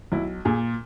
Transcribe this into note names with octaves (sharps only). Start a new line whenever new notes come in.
B1 E4
A#2 G#4